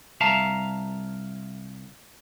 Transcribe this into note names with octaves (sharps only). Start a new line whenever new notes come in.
C2 E5 F5 A5 A#5